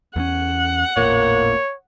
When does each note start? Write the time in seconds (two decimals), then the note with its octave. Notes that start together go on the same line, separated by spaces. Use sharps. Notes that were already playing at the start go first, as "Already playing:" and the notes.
0.16 E2 A3 C#4 F#5
0.97 A1 E2 A#2 A#3 C#5